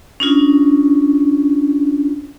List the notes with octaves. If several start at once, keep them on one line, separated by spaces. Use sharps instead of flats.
C#4 D4 F4